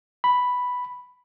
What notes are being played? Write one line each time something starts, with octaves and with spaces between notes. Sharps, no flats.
B5